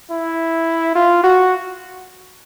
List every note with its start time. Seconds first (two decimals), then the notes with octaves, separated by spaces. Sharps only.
0.11 E4
0.95 F4
1.24 F#4